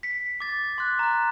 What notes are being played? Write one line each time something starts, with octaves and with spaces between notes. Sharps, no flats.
B6 C#7
D6 A6
C6 D6 F#6
A#5 F#6